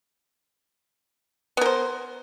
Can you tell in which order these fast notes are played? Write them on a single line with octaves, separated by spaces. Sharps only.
B3 A#4 C5